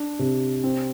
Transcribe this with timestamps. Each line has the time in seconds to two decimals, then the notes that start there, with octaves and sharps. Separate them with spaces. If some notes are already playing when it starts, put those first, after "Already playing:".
Already playing: D4
0.19 C3
0.63 C4